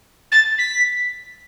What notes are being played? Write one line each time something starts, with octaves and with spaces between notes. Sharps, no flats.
A6
B6